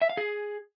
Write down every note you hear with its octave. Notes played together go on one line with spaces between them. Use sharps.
E5
F5
G#4